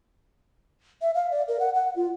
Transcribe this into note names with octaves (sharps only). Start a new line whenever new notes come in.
E5
F5
D5
A#4
F#5
F#5
F4